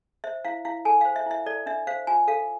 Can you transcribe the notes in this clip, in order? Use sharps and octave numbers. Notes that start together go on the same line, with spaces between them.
C5 E5
E4 F5
E4 F5
A4 G#5
C5 F5
E5
E4 E5
A4 D5
D4 E5
C5 F5
F4 G#5
A4 F5